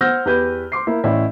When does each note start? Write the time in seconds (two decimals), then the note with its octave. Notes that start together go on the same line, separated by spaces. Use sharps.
0.01 C5 F#5 E6 F6 G6 A#6
0.26 E2 G4 B4 G6
0.72 C6 D6 C7
0.87 A#3 E4 A#4
1.04 A1 C#4 E4 D5